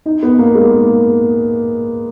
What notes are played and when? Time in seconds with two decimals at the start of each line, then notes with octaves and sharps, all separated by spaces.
0.06 D#4
0.23 B3
0.39 A#3
0.55 G#3